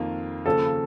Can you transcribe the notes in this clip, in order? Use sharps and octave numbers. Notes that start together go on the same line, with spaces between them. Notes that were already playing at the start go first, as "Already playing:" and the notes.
Already playing: F2 D#3 A#3 F4
D#2 C#3 F3 A4